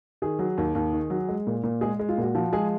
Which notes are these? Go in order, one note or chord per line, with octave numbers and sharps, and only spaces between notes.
D#3 G#4
F#3
D#2
D#2
D#3
F#3
G#3
A#2
A#2
G#3 G#4
G#3
F4
A#2 F#4
F3 F#4
G#3 G#4